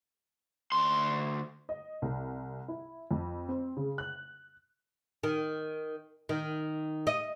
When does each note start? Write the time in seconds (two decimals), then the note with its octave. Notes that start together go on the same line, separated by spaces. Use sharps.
0.72 D2 C6
1.69 D#5
2.02 C2
2.68 E4
3.11 F2
3.49 C4
3.77 C#3
3.98 F#6
5.23 D#3
6.29 D#3
7.07 D#5